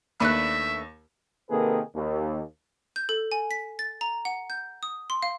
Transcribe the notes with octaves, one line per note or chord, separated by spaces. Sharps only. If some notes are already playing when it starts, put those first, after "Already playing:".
D#2 A3 D4 B4 E5 B5 F#6
C3 D#3 A#3 G#4 A4 B4
D#2
G6
A4
G#5
B6
A6
A#5
F#5
G6
D#6
C6
F5